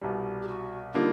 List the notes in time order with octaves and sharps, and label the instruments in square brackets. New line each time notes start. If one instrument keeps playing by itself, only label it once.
[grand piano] C2 B2 G3
[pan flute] G4
F#4
[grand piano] D3 G3 A#3 D#4 [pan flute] F4